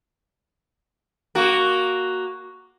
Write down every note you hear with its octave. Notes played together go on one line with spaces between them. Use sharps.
A#3 F#4